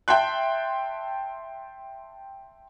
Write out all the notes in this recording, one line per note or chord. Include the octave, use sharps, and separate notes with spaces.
E5 G5 A5 C6 F#6